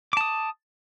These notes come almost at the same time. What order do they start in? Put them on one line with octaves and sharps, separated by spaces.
D6 A5 D#6